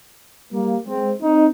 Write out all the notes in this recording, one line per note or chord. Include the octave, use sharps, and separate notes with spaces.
G3 A#3
G#3 C4
C4 D#4